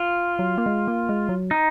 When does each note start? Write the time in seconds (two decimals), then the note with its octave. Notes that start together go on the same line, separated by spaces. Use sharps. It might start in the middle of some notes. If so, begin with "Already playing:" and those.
Already playing: F4
0.39 F#3
0.58 A#3
0.66 G#3
0.88 A#3
1.09 G#3
1.29 F#3
1.51 D#4